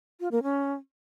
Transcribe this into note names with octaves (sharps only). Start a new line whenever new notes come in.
F4
A#3
C#4